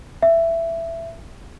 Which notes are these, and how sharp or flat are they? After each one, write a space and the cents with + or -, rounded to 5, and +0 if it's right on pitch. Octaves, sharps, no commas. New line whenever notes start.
E5 +15